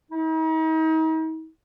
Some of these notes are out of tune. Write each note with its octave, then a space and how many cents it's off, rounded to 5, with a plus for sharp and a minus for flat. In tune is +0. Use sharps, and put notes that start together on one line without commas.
D#4 +40